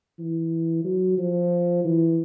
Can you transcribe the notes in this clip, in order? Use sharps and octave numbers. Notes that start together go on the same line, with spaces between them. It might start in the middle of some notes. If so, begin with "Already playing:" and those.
E3
F#3
F3
E3